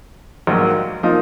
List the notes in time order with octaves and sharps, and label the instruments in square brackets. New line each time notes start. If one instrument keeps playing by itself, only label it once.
[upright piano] A#1 G#2 F#3 A#3
F3 A#3 D#4